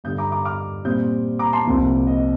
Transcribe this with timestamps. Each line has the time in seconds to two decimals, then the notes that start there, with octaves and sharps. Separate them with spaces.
0.04 G2 D3 G3 D#6 G6
0.18 A#5 D6
0.31 A#5 D6
0.45 D6 F6
0.85 A#2 G3 C4 D#6 G6
1.39 A#5 D6
1.53 A5 C6
1.66 C2 C3 F3 A#3
2.07 D#5